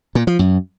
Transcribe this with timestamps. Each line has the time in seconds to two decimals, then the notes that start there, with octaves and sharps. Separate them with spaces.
0.15 A#2
0.27 F3
0.39 F#2